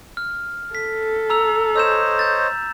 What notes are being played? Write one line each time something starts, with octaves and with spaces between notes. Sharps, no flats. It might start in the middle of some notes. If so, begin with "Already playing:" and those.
F6
A4 B6
A#5 E6 F7
C5 C#5 D#5 E6 G6 E7
G6 A6